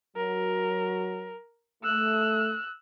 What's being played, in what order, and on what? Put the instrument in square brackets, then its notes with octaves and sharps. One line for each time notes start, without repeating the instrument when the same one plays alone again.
[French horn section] F#3 [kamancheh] A#4
[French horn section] A3 [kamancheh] E6 F#6